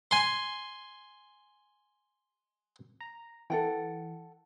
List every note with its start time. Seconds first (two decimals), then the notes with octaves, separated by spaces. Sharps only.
0.11 G#5 C6
3.00 A#5
3.50 E3 A4 F#5 G5